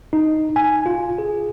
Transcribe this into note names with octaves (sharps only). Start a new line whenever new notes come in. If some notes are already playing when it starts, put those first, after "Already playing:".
D#4
G#5
F4
G#4